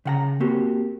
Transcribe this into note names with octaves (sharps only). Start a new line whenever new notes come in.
C#3 F#5 A#5
A#3 C4 F#4 G4